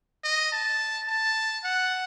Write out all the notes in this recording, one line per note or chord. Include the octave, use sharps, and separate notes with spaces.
D#5
A5
A5
F#5